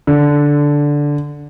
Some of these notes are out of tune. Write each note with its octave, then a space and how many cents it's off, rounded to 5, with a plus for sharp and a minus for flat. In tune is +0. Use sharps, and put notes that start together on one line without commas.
D3 -10